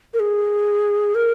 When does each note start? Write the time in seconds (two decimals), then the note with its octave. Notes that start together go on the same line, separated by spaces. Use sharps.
0.14 A#4
0.20 G#4
1.15 A#4